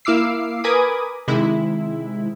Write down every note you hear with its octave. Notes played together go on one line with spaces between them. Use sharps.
A#3 E4 F5 D6 E6 C7
A#4 B4 G#5 B5 D6 D#6
C3 D#3 G#3 E4